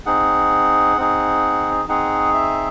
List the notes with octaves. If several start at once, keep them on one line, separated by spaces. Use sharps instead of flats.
C4 D#4 G#4 F#5
C4 D#4 G#4
C4 D#4 G#4 F#5
E5